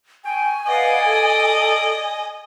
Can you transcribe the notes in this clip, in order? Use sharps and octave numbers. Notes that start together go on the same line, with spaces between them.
G5 G#5 C#6
B4 D5 D#5 F5 F#5
A4